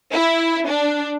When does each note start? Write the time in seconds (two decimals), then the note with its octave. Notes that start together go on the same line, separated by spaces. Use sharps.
0.13 E4
0.68 D4